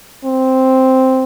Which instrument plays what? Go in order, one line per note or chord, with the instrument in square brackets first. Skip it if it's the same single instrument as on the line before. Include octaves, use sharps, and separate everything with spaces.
[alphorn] C4